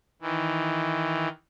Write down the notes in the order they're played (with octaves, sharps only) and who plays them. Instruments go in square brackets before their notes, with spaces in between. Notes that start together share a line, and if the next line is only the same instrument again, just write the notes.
[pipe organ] D#3 E3